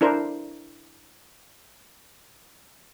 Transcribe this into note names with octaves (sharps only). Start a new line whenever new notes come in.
D4 E4 A#4 C5